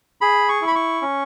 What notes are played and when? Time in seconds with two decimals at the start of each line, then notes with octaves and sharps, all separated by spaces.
0.21 G#4 B5
0.49 C#6
0.62 E4
0.67 B5
0.75 C#6
1.02 C#4